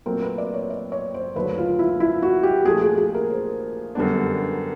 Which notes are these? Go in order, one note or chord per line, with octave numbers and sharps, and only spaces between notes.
A#2 F#3 A3 C4 A#4
B4
D5
C#5
D5
C#5
C5
D#2 D3 F#3 A3 B4
F4
E4
E4
F#4
G4
A#2 F3 A3 G#4
G#4
G#4
A#4
C5
F#2 D3 G3 B3 D4